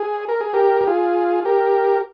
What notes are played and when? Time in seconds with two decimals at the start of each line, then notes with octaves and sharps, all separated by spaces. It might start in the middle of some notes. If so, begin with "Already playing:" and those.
Already playing: G#4
0.29 A#4
0.41 G#4
0.53 G4 A#4
0.81 G4
0.87 F4 G#4
1.45 G4 A#4